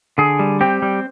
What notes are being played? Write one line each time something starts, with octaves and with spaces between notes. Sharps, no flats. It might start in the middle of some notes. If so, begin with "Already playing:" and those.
D3 G#4
G3
C4 G4
G3